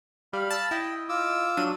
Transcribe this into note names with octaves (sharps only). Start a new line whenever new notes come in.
G3 F5 B5
A5 E6
E4 D#5 G5
F4 D6 E6
F#3 D4 D#7